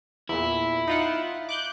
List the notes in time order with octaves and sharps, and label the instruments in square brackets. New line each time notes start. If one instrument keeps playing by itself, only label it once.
[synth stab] E2 A#2 [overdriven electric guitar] E4
[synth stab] D#4 F4 F#5
D6 F#6 G6